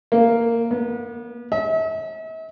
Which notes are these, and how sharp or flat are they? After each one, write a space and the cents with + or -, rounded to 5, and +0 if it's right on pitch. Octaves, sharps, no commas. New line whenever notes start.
A#3 -10
B3 -40
E5 -45